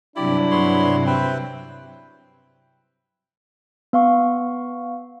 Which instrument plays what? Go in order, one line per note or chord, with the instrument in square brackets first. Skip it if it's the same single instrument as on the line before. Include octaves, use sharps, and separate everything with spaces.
[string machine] G2 C3 F#3 [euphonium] D4 [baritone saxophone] E4 [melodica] G4 D5
[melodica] B3 C#5 C6
[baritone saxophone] C4 [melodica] E4 B4 G5
[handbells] B3 F5 C#6